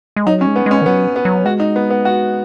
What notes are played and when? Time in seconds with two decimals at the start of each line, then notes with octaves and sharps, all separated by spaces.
0.16 G#3
0.26 F#3 D#4
0.41 C#4
0.47 G#3
0.56 B3
0.66 G#3 C#4
0.82 D#3
0.86 F#3 B3
1.16 B3
1.25 F#3
1.45 G#3 F#4
1.60 D#4
1.76 B3
1.90 B3
2.05 F#4